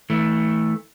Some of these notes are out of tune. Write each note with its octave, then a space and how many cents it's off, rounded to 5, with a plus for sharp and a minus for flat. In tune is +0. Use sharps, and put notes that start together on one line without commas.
E3 -30 A3 +0